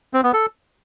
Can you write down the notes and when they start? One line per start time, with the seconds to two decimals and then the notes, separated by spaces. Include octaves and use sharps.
0.14 C4
0.24 B3
0.34 A4